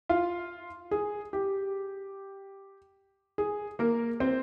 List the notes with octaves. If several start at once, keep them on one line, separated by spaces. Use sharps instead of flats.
F4 F5
G#4
G4
G#4
A#3 A#4
C4 C5